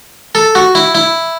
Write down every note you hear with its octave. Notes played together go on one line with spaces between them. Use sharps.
A4
F#4
E4
E4